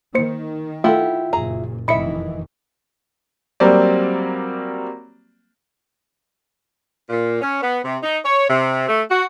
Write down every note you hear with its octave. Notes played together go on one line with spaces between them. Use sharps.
D#3 A#3 C5 C#7
A3 E4 F4 G4 A4 E5 F#5
F#1 A#2 G#4 A#5
F1 D#3 E3 E4 D#5 E5 B5 C#7
F#3 G3 A#3 C4 D5
A#2
C#4
B3
C3
D#4
C#5
C3
A3
F#4